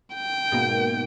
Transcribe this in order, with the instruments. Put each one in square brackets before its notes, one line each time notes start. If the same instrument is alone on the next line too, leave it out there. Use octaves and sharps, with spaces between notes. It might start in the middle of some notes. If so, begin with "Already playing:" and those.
[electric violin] G5
[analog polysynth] G#2 B2 A#3